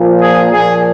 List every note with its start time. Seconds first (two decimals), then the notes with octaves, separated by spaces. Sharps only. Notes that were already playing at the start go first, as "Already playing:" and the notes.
Already playing: A#2 F3
0.21 G#4
0.52 A#2 F3 G#4